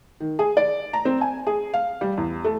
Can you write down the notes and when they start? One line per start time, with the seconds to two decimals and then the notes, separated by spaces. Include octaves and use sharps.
0.20 D#3
0.39 G#4
0.57 D5
0.93 A#5
1.05 C4
1.21 G#5
1.47 G#4
1.74 F5
2.01 G3
2.17 E2
2.44 A3